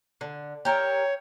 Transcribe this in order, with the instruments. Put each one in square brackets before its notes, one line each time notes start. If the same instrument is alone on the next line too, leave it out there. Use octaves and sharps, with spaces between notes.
[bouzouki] D3
[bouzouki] G4 A#4 E5 [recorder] C#5